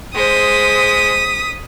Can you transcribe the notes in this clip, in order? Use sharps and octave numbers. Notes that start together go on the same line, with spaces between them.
G#3 C5 D#6 B6